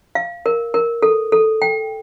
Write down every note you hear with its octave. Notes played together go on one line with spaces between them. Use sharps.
F5
A#4
A#4
A4
A4
G5